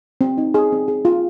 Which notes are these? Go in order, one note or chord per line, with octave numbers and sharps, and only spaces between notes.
C4
D#4
G#4
C4
G#4
F4